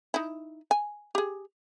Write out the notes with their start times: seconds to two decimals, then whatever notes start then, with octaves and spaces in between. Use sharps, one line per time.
0.14 D#4 E4
0.71 G#5
1.15 G4 G#4